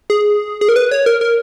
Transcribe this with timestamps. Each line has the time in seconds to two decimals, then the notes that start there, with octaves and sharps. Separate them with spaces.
0.10 G#4
0.61 G#4
0.69 A#4
0.76 B4
0.91 C#5
1.06 A#4
1.21 A#4